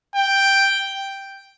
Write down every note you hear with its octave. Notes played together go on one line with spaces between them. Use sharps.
G5